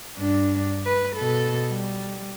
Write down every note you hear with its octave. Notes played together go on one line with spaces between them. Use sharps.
G2 D4
B4
B2 A4
G3